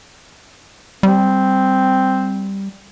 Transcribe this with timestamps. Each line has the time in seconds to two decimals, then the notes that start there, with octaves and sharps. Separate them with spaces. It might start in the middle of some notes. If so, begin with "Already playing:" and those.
1.03 G3 C4